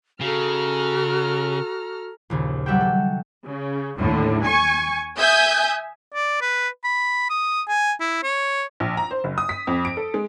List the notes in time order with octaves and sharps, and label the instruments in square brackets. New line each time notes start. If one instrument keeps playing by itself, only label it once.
[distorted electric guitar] C#3 [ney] F#4 [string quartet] A4 A#5 F6
[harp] A#1 D#2 C#3
F#3 G3 E5 F#5 G5
A4
[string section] C#3
D#2 A2 D3
G#5 C#6
E5 G#5 D#6 G6
[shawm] D5
B4
B5
D#6
G#5
E4
C#5
[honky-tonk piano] A#1
A#5
C5
F#1
D#6
B6
F2
D7
A4
G#3